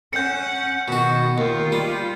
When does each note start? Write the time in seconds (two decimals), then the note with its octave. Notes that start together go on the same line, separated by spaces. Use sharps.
0.13 C#4 F#5 G6 C#7
0.88 B2 D#3 F#4
1.38 D#2 F4
1.72 G3